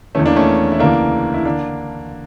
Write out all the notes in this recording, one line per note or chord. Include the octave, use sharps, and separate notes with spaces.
E2 E3 A3 C#4
A#3 D4
A3 C#4
E4
D2 C#3 E3 A#3 D4
E4
D3 A#3 D4